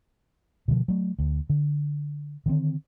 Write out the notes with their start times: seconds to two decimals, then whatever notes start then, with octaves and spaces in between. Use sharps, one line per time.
0.68 B2 D3 D#3 F3
0.88 F#3 A3
1.19 D2
1.49 D3
2.46 D3 D#3 C4